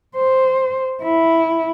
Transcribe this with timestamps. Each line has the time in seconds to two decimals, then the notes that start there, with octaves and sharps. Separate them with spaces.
0.16 C5
1.03 E4